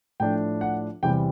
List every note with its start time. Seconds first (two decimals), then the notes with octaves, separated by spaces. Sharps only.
0.20 A2 F3 A3 D4 G5
0.61 F#5
1.03 E2 C3 E3 G3 G5